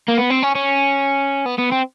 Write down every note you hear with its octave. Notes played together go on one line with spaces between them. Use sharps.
A#3
B3
C4
C#4
C#4
B3
B3
C4